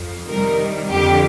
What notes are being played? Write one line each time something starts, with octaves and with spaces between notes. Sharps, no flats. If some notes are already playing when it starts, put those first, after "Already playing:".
Already playing: F2 F3
C3 D#3 G3 A#4
F2 D3 F3 G4